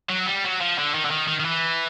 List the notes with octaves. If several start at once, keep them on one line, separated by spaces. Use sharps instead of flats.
F#3
G3
F#3
F3
D3
D#3
D3
D#3
D#3
D#3
E3